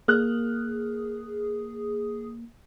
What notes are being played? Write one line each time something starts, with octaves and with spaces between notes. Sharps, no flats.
A#3 G#4 F6 F#6